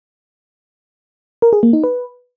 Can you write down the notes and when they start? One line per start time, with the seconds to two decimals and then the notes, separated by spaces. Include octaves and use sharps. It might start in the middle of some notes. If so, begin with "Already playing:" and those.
1.42 A#4
1.53 G#4
1.63 A#3
1.73 D#4
1.84 B4